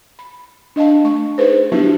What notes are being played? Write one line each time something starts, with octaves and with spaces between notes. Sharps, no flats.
B5
D4 D#5 F5 A5
A3 C#6
D#4 G#4 B4 C5
F#3 B3 D4 E4 F#4 G4